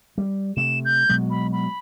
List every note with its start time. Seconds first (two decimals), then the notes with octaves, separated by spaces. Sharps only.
0.18 G3
0.57 C3 A3 E7
0.85 G6
1.09 B2 F#3 G#3
1.30 B5
1.52 B5